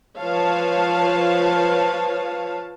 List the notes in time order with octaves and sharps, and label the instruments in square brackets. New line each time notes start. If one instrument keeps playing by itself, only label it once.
[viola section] F3 B4 C#5 F5 A5